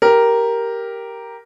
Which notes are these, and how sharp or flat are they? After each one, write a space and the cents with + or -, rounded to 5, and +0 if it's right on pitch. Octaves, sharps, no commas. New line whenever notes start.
G4 +0 A#4 +0